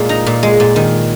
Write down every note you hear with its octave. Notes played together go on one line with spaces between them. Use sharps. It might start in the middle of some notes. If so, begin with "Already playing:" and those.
Already playing: A#2 G#3
D#4 A#5
A#2
G#3
A#2
D#3